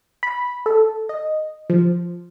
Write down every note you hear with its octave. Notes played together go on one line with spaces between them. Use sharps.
B5
A4
D#5
F3